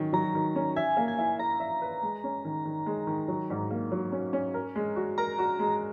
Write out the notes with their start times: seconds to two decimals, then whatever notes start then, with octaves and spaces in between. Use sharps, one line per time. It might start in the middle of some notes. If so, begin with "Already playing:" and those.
Already playing: D#3 F#3 C#4
0.13 F#3 A#5
0.35 D#3
0.56 C#4
0.76 E5 G#5
0.97 A#3
1.08 G#5
1.18 E4
1.39 E4 A#5
1.60 E5
1.82 B4
2.02 G#3
2.24 C#4
2.45 D#3
2.65 D#3
2.86 G#3
3.07 D#3
3.28 F#3
3.50 G#2
3.71 A#3
3.92 F#3
4.12 C#4
4.33 C#4
4.54 A#4
4.76 G#3
4.96 F#4
5.18 A#4 A#5
5.39 F#4
5.59 G#3